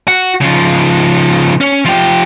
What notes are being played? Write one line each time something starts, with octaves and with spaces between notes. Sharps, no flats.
F#4
C#3 F3
C#4
F3 G4